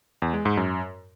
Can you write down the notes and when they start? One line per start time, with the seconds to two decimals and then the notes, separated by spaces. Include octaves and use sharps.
0.22 E2
0.34 G#3
0.45 G#2
0.57 F#2